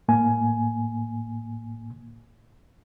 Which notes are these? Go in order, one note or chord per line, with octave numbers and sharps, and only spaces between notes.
A2 A#3 G#5